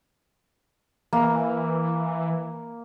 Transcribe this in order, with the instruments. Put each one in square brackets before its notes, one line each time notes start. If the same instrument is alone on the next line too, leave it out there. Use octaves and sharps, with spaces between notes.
[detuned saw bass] E3 [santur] A#3